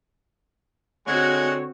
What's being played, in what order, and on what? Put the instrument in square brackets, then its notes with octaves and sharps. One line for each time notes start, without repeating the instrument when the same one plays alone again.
[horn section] D3 C#5 [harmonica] G#3 F#5 G#5 [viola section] C4 F#4